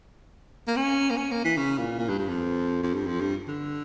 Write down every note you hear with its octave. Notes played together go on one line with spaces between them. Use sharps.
A#3
C#4
A#3
C#4
A#3
E3
C#3
A#2
A#2
G2
G2
F2
F2
G2
F2
G2
D3